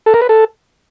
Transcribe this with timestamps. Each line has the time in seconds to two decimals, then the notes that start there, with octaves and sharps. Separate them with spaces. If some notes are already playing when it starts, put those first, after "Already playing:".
0.06 A4
0.14 A#4
0.22 B4
0.29 A4